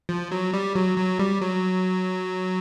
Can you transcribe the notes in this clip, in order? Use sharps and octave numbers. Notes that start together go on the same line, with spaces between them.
F3
F#3
G3
F#3
F#3
G3
F#3